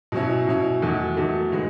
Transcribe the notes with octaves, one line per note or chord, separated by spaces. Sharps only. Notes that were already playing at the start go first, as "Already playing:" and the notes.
B2 F#3 C#4 E4
B2 F#3 C#4 E4
E2 D#3 F#3 A3
E2 D#3 F#3 A3
D#3 G#3 B3